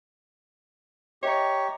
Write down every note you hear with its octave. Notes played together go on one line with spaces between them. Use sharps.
G4 C#5 D#5 E5 A#5